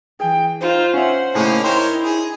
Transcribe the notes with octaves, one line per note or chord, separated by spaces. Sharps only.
E3 G#4 G5
D#4 F4 C5 F5
C#4 E5 F#5
A2 C#3 A#3 C#4 D#4 G#4
E4 A#4 C5 C#5 G5
G#4